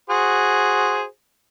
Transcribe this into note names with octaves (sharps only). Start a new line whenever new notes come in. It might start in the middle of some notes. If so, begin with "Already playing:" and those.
F#4 G#4 C5